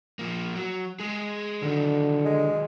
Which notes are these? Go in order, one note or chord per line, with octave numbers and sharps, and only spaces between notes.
F3 A#3
F#3
G#3 G#4
D3 D#3 F#3
G#3